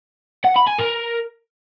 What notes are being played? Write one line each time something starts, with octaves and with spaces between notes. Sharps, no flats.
F#5
B5
G#5
A#4